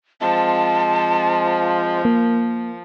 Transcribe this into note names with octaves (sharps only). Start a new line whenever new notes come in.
F3 G#3 C4 F4 A5
A#3